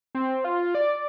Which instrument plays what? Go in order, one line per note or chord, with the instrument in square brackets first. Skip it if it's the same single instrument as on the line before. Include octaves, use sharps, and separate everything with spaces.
[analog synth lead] C4
F4
D5